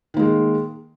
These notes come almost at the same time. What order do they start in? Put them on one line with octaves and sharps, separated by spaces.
D#3 A#3 G#3